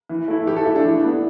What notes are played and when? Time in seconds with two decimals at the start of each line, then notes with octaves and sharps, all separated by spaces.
0.09 E3
0.28 A3 E4
0.46 E3 G4
0.56 A4
0.65 A3 E4 G4
0.75 D4
0.84 E3
1.03 B3 E4